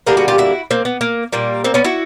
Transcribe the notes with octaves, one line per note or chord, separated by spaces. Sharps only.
D3 G3 A#3 G#4 A#4
F#4 G#4
F4 G4
E4 F#4
A#3 C4
B3
A#3
A#2 G3 A#3
A#3 C4
B3 C#4
E4 F#4